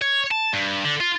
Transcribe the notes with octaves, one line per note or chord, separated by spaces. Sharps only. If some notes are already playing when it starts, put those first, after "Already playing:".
C#5
A5
G2
D3
F4